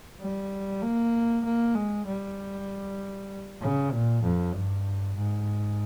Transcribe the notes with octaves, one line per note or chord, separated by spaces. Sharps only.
G3
A#3
A#3
G#3
G3
C#3
A#2
F2
G2
G#2